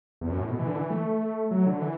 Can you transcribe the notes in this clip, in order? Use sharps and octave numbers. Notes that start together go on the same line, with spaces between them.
E2
F#2
A2
B2
E3
D3
E3
A3
F#3
D3
E3